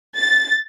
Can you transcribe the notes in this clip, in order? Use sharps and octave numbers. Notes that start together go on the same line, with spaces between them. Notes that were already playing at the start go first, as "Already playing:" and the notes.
A6